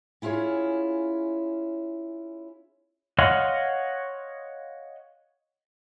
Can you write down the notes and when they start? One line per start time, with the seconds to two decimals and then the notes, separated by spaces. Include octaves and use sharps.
0.22 C#4 E4 F4 G#4 C#5
3.19 C#5 D#5 F5 F#5 C6